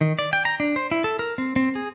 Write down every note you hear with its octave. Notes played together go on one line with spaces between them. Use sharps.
D#3
D5
G5
A#5
D4
C5
E4
A4
A#4
C4
C4
G#4